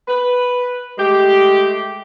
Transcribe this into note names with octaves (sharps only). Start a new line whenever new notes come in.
B4
G#3 A3 G4